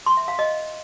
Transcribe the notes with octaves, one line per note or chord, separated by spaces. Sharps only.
C6
E5
F5
D#5